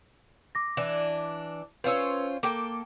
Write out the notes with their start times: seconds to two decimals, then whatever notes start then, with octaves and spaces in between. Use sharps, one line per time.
0.55 D6 A#6
0.77 E3 D4
1.84 C#4 F4 B4 C5 E6
2.43 A#3 A4 G5 D6